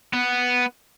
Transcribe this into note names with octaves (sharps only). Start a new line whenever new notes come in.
B3